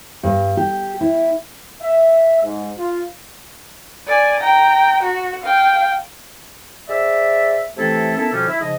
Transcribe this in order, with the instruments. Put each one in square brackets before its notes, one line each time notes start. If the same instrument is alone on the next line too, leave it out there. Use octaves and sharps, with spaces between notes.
[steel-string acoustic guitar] G2
G4
E4
[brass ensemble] E5
G#2
F4
[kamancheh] D5 G#5
G5 A#5
F#4
F5 G5
[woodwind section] G#4 C5 D5 E5
C3 E3 A3 C4 E4 A4
A#3 B3 C#4 D4 E4 A4
F2 B2 D3 F3 G3 C#4
E4
G#2 C#3 F3 D#5